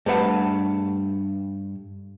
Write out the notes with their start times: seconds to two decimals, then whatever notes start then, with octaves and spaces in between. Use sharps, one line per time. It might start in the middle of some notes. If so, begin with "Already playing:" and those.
0.06 G2 A3 B4 F#5 A5